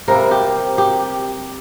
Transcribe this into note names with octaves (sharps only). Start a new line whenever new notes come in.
C3 G3 A#3 A#4
G4
G4